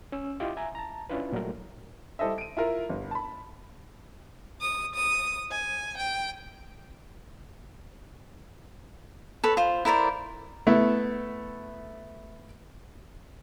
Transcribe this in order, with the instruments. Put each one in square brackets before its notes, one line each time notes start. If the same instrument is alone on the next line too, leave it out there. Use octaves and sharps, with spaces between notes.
[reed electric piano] C#4 E6
E4 F4 G4 D#5 D6
E5 G#5 A#5
A5 A#5
C#4 D4 E4 F4 B4
A#2 F#3 G3 A3 A#4
[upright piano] G3 E4 A4 C5 D#5 E5
D7 D#7
E4 F4 A#4
G1
A5 B5
[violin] D#6
D#6
G#5
G5
[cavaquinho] A4 B4 C#5
F4 C5
E4 A#4 C5 D5
[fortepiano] A3 B3 E4